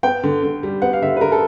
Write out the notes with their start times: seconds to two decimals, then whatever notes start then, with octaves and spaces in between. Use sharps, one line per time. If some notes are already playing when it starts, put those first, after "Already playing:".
0.03 B3 G5
0.23 D3
0.43 D3
0.63 G3
0.82 B3 F#5
0.93 F5
1.02 D3 E5
1.16 B4
1.21 D3 A#4
1.32 A4